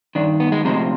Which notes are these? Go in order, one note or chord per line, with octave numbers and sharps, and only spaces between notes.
G2 D#3 D4
B3
G#3
D2 C3 F3 G#3